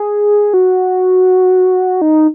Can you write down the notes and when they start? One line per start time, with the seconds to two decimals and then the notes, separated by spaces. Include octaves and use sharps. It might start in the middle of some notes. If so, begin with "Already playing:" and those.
Already playing: G#4
0.54 F#4
2.02 D#4